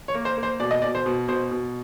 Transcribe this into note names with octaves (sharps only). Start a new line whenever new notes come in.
C#5
A#3
C5
A#3
C5
B2 D5
D#5
B2 D5
C5
B2
B2 C5
B2